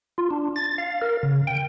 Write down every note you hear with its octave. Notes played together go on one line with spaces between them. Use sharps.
F4
D4
A6
F5
A#4
C#3
G5